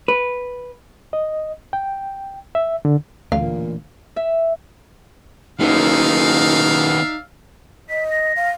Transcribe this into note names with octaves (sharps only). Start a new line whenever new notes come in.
B4
D#5
G5
E5
D3
D2 A#2 E3 A3 D4 F5
E5
F#1 D#3 B3 D#4 D5 E5 F5
D#5 B6
A#6
F5